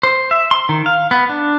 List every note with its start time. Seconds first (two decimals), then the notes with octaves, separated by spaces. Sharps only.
0.03 C5
0.31 E5
0.51 C6
0.69 D#3
0.86 F5
1.11 B3
1.29 D4